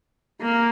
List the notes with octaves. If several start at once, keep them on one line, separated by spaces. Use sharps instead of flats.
A#3